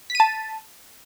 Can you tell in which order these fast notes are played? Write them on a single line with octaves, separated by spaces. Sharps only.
B6 D#7 A5